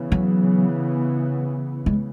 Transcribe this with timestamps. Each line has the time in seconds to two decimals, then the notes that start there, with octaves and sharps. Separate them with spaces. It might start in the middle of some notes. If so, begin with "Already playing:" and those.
Already playing: C#3 E3 B3
0.12 F#3
1.86 G#3